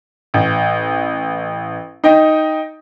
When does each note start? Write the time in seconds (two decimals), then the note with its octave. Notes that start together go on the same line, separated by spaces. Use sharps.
0.34 A1
2.04 D#4 D#5 G5